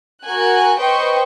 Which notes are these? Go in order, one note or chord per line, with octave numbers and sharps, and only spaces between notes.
F#4 A#4 G#5 F#6
B4 C5 D#5 G5 C#6